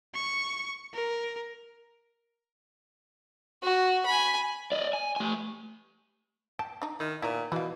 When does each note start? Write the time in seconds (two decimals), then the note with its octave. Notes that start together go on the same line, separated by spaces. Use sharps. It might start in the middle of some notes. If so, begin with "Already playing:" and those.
0.15 C#6
0.93 A#4
3.63 F#4
4.06 G#5 B5
4.72 D5 D#5
4.93 G#5
5.16 A3 G#5
6.59 G5 A5
6.82 D4 D#4
7.00 D#3 E4
7.22 A#2 D#3 B3 E4 A#4
7.52 B2 E3 F#4 F5